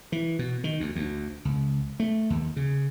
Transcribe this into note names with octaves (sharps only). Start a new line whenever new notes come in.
E3
B2
D#3
D2
D2
C#2
A3
D#2
C#3